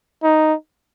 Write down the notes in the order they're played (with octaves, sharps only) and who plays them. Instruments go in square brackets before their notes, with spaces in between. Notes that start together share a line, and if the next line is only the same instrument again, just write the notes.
[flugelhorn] D#4